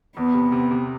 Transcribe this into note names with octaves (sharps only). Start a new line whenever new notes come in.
E2 B3
C3
C3
C3